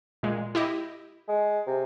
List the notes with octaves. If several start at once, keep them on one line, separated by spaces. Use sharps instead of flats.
A#2 G#3
E4 G4 D#5
G#3
C3